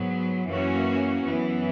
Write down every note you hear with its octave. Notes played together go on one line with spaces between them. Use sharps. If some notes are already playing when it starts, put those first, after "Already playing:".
Already playing: G#2 F#3 B3
F#2 E3 A#3 C#4 F#4
F#2 E3 B3